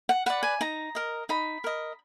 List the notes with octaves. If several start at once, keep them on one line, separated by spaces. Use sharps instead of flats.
F#5
B4 D5 F#5
G#5
D#4 A#5
A#4 D#5
D#4 B5
A#4 D#5